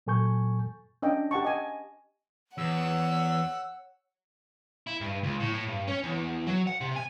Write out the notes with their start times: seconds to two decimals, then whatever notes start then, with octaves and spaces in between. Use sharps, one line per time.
0.07 A#2 F#3 A4 G#5 C#6 G6
1.02 C#4 D4 D#5 G5
1.31 G4 F#5 A5 C#6
1.45 D#5 G#5
2.58 E2 C#5 F#5 E6
4.87 E4
5.01 G2
5.23 C#2
5.40 A2
5.53 A2
5.68 G2
5.88 C#4
6.03 E2
6.47 F#3
6.67 F#5
6.80 C3
6.96 G#5